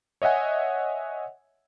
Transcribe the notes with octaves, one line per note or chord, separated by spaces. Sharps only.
C#5 D#5 E5 F#5 G#5